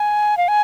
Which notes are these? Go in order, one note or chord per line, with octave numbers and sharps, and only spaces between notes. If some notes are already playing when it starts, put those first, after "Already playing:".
Already playing: G#5
F5
G#5